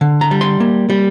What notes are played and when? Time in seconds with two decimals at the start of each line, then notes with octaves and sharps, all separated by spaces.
0.01 D3
0.21 A#5
0.31 G3
0.41 C6
0.60 A#3
0.90 G3